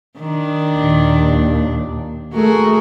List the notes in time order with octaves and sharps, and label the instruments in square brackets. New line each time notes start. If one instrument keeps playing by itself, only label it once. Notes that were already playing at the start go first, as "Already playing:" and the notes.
[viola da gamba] D#3 D4
[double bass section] D#2 A#2
[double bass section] A3 [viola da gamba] F#4 G#4 A#4